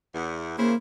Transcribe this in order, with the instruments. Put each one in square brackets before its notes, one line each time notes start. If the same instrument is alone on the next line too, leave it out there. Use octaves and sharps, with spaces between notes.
[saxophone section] E2
[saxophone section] C#3 E4 C5 [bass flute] A#3